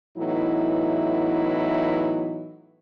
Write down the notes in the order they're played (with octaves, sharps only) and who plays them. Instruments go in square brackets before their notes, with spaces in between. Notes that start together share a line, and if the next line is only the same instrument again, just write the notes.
[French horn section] A2 E3 F#3 B3 D#4 E4